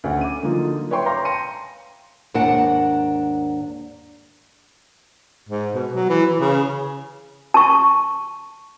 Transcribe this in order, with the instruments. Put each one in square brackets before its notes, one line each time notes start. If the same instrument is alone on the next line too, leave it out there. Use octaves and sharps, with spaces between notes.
[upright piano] D2 A3 C#4 F#5
D6 D#7
D3 F3 F#3 A#3 D#4 F4
B4 C#5 E5 G5 C6 C#6
F5 A#5 C6 D6 G6 A#6
G5 A5 C6 A#6 C#7 D#7
[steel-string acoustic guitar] D#2 G#2 D4 A#4 F#5
[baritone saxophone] G#2
B2
F#3
E3
E3
C#3
[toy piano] A5 C#6